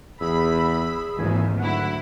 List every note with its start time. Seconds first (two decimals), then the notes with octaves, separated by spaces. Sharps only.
0.21 E2 G#4 B5 E6
1.18 G#1 D#2 E3 F3 E5 G#5
1.60 D2 F#3 E4 F#5